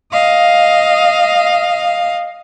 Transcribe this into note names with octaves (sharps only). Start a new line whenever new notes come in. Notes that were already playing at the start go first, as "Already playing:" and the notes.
D#5 F5